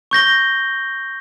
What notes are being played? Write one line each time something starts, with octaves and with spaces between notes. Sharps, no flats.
C#6 G6 A#6 G7